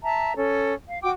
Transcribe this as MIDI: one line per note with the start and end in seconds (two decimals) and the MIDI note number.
0.03 0.34 76
0.03 0.34 81
0.03 0.34 82
0.35 0.74 61
0.35 0.74 69
0.89 1.01 77
1.03 1.11 66
1.03 1.11 79
1.03 1.11 86